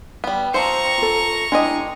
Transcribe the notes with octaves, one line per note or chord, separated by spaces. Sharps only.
G3 B3
F3 C4 C5 A#5 C#6
F4 A4
G#3 D4 E4 G4 D#5